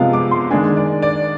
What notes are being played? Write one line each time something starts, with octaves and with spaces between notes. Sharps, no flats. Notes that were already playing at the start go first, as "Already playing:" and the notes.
Already playing: C3 F3 G#3 B3 D#5 F5
D6
C6
D#3 G#3 D4 G#5
D5
D5